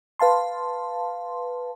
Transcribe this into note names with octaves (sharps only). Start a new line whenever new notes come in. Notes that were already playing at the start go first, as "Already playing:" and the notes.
B4 F5 A5 C6